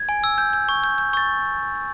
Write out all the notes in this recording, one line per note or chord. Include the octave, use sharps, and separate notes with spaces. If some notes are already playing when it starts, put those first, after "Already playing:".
Already playing: G#6
G#5
E6
G6
G6
C#6
G6
G6
C#6 A6